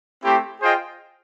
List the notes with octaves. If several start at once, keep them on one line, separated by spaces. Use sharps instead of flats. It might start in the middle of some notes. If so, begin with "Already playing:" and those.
A3 C4 E4 G4
F4 G#4 C5 D#5 G5